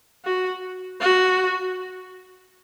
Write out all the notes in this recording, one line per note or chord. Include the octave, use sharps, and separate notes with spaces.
F#4
F#4